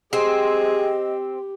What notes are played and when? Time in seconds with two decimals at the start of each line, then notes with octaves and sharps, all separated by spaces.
0.13 C4 G4 G#4 D#5